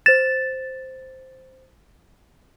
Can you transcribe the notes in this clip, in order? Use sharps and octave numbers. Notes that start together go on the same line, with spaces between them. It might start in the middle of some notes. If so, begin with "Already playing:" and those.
C5 A6 E7